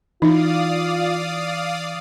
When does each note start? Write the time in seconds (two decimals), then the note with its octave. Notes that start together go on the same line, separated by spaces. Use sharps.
0.22 E3 D#4 F4 D5 F5 D#6